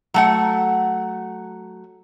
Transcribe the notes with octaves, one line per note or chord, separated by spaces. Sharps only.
F#3 A3 F#5